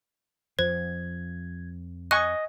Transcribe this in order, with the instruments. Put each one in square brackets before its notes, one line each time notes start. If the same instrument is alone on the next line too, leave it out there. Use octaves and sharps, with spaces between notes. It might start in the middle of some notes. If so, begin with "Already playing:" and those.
[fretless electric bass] F2 F3 [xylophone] C5 [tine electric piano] G#6
[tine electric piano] D#5 [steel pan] G#5 C#6 D#6 [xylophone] F#6